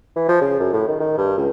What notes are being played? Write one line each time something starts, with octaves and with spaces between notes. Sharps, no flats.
E3
F3
C#3
F#2
A2
D#3
D#3
G2
C#2